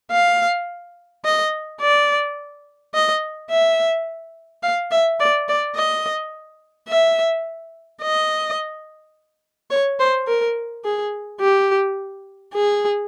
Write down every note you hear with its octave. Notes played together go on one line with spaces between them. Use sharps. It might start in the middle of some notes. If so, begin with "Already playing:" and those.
F5
D#5
D5
D#5
E5
F5
E5
D5
D5
D#5
E5
D#5
C#5
C5
A#4
G#4
G4
G#4